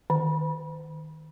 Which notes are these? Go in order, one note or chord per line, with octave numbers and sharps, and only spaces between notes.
D#3